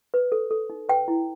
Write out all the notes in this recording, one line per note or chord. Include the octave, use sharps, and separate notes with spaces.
B4
A4
A4
D#4
B4 G5
E4